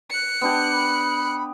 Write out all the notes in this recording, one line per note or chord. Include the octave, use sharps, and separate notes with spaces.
F#6 C#7
B3 D4 G4
B5